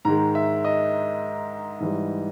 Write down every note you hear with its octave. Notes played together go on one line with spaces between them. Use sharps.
G#2 D#3 G#3 A#5
E5
D#5
G#2 E3 G3